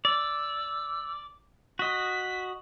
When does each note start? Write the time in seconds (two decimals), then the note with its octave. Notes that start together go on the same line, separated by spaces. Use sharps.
0.05 D5 E6
1.79 F#4 D#5 B6